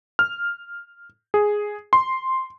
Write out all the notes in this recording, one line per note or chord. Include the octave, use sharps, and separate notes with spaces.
F6
G#4
C6